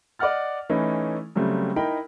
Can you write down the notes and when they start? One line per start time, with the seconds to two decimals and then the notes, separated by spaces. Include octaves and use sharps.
0.19 D5 D#5 F#5 F6 A6
0.70 E3 A3 C#4 D#4 E4
1.36 C#3 F#3 G3 A3 C4
1.76 D#4 E4 A#4 G5 B5